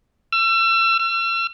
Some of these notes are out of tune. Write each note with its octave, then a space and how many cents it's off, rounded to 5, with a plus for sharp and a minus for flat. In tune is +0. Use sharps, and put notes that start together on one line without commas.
E6 +35
E6 +45